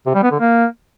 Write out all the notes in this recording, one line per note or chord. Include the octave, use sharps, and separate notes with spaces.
C3
G3
B3
D3
A#3